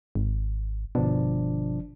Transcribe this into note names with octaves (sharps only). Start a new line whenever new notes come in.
G#1
G1 B2 F3 D4